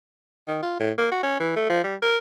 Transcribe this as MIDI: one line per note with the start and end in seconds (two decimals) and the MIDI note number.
0.48 0.60 51
0.62 0.78 65
0.80 0.91 45
0.98 1.08 58
1.11 1.19 66
1.23 1.37 61
1.40 1.54 52
1.56 1.67 57
1.70 1.83 53
1.84 1.95 55
2.02 2.17 70